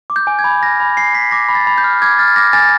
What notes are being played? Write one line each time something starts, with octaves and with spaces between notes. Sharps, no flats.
D6
G6
G#5
G#6
B5
F6 A#6
B5
G#5 C7
B5 B6
D6 A#6
B5
A6
B5
G6
F6
D6 G#6
F6 A6
D6 A#6
G#5 A6